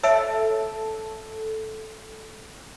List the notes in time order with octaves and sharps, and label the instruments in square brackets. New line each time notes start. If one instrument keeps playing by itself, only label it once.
[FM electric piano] A4 [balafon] C#5 E5